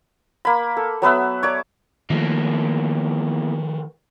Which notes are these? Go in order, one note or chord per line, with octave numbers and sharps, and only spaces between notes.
A#3 B5
A4
F#3 B3 B4 E5
C#5 D5 D6
E2 D#3 F3 A3 A#3